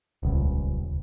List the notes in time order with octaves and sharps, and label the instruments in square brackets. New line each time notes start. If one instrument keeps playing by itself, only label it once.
[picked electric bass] D#1 C#2